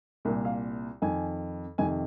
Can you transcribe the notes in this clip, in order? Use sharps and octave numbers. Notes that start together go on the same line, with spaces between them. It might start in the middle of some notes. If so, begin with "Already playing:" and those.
C2 A#2 A#4
F5
F2 D#3 G#5
F2 C3 D#3 G#5